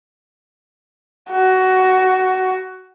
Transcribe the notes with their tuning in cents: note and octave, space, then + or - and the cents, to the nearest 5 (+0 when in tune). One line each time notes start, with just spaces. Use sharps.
F#4 +15